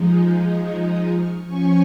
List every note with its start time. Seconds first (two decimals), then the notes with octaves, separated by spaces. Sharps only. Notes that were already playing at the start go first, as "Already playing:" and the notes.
Already playing: F3 G#3 D#4
0.59 G#5 C#6
0.87 A#5 D#6
1.16 C#6 F6
1.44 F3 C#4 G#5 C#6